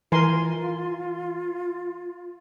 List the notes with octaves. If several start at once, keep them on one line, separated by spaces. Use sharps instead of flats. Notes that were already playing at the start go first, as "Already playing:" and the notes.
E3 F4 A#4 G#5 C6